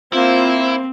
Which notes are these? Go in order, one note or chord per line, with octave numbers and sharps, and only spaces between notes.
A#3 C4 E4 F4 C5